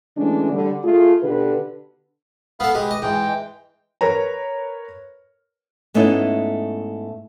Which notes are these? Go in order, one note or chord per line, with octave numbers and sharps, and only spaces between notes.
D3 E3 G#3 A3 C#4 D4
D3 G3
A3 F4 G#4
B2 D3 G4 B4
B3 A4 F5 B5
G#3 G4 B4
D#5
G#2 E3 G#3 G5
A#4 B4 C#5 A#5
G#2 A3 B3 C#4 D#4 E4